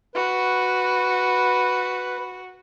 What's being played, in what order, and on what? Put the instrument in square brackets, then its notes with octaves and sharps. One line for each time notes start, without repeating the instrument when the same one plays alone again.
[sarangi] F#4 [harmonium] B4